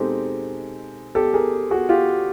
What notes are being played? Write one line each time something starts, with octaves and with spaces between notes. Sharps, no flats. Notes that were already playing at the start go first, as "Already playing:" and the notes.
Already playing: B2 G#3 C4 D#4 G4 A4
G4 A4
G#4 A#4
F#4 G#4
F4 G4